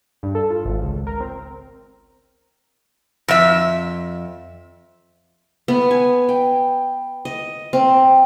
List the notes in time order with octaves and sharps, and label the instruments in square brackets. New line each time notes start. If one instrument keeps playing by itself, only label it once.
[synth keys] G2
A4
F4
G#1
C#2
A#4
C4
[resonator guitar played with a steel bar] F2 E5
[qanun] B3
G#5
G5
D#5
C4